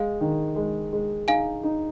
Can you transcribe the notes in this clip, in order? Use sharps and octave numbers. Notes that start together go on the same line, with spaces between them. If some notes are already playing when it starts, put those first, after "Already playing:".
Already playing: G#3 F5
D#3
G#3
G#3
D#4 F5 G#5
D#4